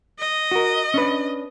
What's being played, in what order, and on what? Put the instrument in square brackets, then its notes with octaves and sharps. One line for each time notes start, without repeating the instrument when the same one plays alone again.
[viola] D#5
[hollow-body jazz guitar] F#4 A#4
C#4 D4 B4